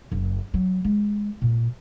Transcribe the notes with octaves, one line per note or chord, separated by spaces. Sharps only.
F#1
F#3
G#3
A#2